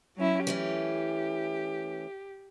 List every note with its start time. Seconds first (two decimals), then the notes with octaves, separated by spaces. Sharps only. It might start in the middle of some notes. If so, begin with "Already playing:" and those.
0.16 F#3 C#4 E4
0.47 E3 A3 C#4 G4